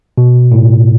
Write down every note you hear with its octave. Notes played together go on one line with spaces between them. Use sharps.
B2
A2